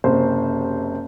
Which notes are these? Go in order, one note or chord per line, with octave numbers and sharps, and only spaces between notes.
F#1 C3 C5